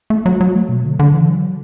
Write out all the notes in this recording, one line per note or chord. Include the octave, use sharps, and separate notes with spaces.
A3
F#3
F#3
A3
B2
D3
D3
E3
F#3